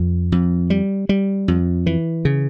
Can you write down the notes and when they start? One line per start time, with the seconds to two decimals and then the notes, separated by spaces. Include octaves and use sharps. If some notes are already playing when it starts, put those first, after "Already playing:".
Already playing: F2
0.32 F2
0.70 G3
1.09 G3
1.48 F2
1.86 E3
2.25 C#3